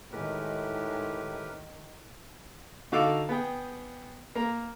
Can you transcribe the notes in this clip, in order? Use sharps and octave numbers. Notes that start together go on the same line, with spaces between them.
A2 D#3 G#3 G4 A#4 B4
D3 D#4 F#4 A4 F5 D6
B3 G#4 G5
A#3 A#5